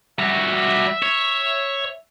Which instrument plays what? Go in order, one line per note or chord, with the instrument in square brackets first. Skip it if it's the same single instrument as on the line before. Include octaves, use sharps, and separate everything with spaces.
[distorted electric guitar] G3 F#4 [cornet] E5
[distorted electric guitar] C#5